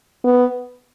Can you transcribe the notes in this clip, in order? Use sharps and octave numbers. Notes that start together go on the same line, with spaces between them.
B3